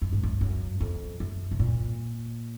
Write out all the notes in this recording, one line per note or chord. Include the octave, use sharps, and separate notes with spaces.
F#2
G#2
F#2
F#2
F2
F#2
C3
A#2